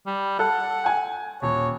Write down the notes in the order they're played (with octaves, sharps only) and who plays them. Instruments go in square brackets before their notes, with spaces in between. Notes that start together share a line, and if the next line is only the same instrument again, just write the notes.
[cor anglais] G3
[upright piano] A4 [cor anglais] F#5
[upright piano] G5 G#5
[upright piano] D#1 [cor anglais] C#5